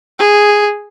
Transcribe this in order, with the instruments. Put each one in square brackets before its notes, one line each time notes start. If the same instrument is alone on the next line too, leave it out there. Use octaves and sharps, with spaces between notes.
[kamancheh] G#4